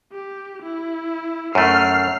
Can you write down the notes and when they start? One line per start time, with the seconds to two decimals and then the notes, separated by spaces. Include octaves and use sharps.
0.12 G4
0.63 E4
1.55 F#2 A3 F6 C7